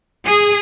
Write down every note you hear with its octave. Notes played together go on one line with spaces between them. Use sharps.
G#4